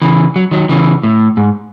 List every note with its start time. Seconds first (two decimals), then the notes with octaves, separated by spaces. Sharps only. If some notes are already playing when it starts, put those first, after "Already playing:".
0.02 C#3 E3
0.36 F#3
0.51 D#3 F#3
0.69 C#3 E3
1.03 A2
1.37 G#2